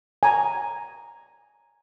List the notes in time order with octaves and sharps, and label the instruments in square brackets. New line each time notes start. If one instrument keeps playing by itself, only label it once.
[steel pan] G#5 A#5